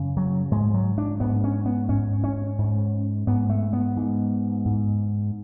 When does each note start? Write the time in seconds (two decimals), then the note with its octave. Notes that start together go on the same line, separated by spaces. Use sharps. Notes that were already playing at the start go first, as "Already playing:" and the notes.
Already playing: F#2 C#3
0.17 F#3
0.51 G#2 G#3
0.74 F#3
0.98 D4
1.20 G#2 B3
1.44 C#4
1.66 B3
1.89 G#2 C#4
2.24 C#4
2.58 G#2
3.27 G#2 B3
3.49 A3
3.73 B3
3.97 G#2
4.65 G#2